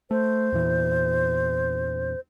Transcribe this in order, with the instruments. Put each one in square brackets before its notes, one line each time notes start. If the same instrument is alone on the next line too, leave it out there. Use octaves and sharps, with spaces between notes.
[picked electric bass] A3 [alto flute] C5
[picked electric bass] E2 A#2 E3